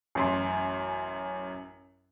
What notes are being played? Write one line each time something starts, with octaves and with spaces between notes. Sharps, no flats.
A1 F#2 C6